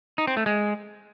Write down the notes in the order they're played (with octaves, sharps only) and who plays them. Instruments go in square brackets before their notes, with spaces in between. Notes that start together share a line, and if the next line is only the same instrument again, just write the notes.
[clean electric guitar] D#4
C4
A3
G#3